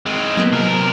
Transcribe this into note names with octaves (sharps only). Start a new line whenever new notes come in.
G#3 C4
F#3 A#3 B3
C3 A#4